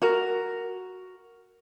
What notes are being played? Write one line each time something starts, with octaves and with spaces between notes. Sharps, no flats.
F#4 A#4